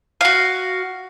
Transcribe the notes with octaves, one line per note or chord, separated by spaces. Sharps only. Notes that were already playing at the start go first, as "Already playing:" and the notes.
F#4 F5